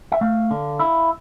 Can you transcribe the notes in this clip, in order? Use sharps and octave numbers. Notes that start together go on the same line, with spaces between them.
E5
A3 F5
D3
E4